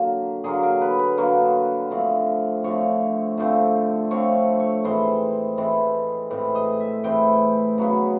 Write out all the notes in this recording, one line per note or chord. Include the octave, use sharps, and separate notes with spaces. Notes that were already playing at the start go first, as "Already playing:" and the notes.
Already playing: D3 F#3 A#3
D3 F#3 A#3 G#4
A#4
B4
B4
D3 F#3 A#3
D3 F3 A3 C4
D3 F3 A3 C4 C#5
D3 F3 A3 C4
D3 F3 A3 C4 C#5
C#5
A2 E3 G#3 C4 C5
A2 E3 G#3 C4
A2 E3 G#3 C4
D#5
E5
A2 E3 G#3 C4 G5
C#3 F#3 B3